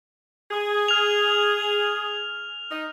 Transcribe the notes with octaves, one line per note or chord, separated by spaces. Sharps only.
G#4
F6 F7
D#4